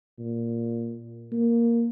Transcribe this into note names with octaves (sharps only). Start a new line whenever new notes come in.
A#2
A#3